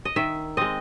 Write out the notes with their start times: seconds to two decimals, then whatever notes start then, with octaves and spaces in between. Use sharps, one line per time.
0.05 D#5
0.16 D#3 E5
0.57 G#3 C4 D#5